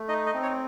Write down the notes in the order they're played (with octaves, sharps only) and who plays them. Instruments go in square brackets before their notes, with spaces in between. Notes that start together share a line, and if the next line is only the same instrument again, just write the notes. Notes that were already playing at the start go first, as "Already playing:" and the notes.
Already playing: [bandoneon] A3
D#4 D#5
D#5
C4
C#5